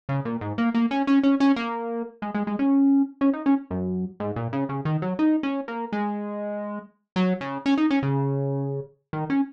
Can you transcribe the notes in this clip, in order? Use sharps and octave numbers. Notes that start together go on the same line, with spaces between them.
C#3
A#2
G#2
A#3
A#3
C#4
C#4
C#4
C#4
A#3
G#3
G#3
G#3
C#4
C#4
D#4
C#4
F#2
G#2
A#2
C#3
C#3
D#3
F#3
D#4
C#4
A#3
G#3
F#3
C#3
C#4
D#4
C#4
C#3
D#3
C#4